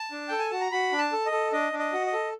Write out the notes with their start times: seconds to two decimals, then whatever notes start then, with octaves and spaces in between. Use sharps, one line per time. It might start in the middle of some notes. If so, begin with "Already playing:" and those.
Already playing: A5
0.11 D4
0.28 A4 G5
0.39 G#5
0.50 F#4 A5
0.61 A#5
0.72 F#4 B5
0.92 D4
0.98 A5
1.12 A4
1.26 D#5
1.32 A4
1.52 D4 D#5
1.73 D4
1.79 D#5
1.93 F#4
2.06 D#5
2.13 A4